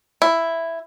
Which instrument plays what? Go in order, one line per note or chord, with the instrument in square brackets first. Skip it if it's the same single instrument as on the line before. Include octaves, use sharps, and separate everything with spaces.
[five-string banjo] E4